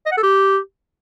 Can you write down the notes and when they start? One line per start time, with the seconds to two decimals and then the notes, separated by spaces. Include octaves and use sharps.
0.06 D#5
0.12 F#5
0.17 A4
0.23 G4